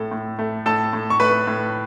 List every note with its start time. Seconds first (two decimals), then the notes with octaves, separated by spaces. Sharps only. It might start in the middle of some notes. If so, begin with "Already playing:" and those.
Already playing: A2 A3 A4
0.11 A2
0.39 A3
0.66 A2 A4 A5
0.93 A2
1.10 C#6
1.20 A3 B4 B5
1.47 A2